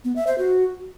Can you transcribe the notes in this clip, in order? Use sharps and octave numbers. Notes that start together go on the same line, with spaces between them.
B3
E5
C5
F#4